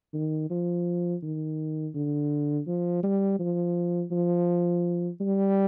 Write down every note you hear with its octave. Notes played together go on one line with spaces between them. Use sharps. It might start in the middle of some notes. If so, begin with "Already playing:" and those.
D#3
F3
D#3
D3
F3
G3
F3
F3
G3